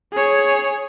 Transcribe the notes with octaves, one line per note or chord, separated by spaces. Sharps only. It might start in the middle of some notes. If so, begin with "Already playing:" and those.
G#4 C#5